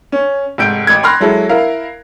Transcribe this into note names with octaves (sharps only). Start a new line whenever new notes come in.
C#4
F1 G#2 G6 D7
A1 G#6
B5 C6 F6 F#6 A#6
F#3 G#3 E4 A4
E4 A#4 F5 A#5